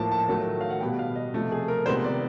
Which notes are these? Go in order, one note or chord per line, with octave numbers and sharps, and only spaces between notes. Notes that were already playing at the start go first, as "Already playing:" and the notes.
Already playing: A2 F3 A#3 A5
A5
D#3 F#3 A3
F5
F#5
B2 G3 B3 G5
F5
D#5
C3 F3 A3
G#4
A#4
C3 D#3 G#3 B3 C5
D5